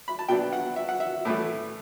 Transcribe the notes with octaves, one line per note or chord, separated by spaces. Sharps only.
B5
A5
B2 F#3 B3 D4 G5
F#5
E5
F#5
E5
A2 E3 A3